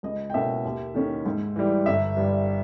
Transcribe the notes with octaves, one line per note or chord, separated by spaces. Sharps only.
C#2 D#5
G5
B2 A#3 C#4 E5
D#2
D#3 A#3 C#4
G#2
E3 G3
G1 E5
G2 G3